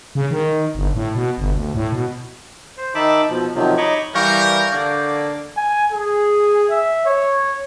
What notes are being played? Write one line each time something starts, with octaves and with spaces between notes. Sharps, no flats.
C#3
D#3
G1
A2
B2
G1
D2
A2
B2
C5
D#3 D#4 E5 A5 B5 D6
B2 F3
C3 D#3 F3 F#3
D#4 C#5 D#5 B5 C#6 D6
E3 G3 A#4 F5 C#6 G6
D3 A#3 D5
G#5
G#4
E5
C#5